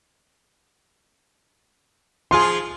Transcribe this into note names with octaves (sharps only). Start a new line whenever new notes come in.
F3 F4 G#4 C6